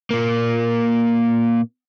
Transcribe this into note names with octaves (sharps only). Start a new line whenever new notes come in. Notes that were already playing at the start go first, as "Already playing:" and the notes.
A#2 A#3